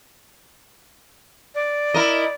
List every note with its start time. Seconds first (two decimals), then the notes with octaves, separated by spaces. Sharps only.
1.55 D5
1.94 E4 A#4 D#5